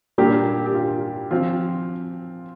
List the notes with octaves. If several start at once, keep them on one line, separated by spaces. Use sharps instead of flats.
A#2 G3 A#3 D4 G4
G4
F4
F3 C4 F4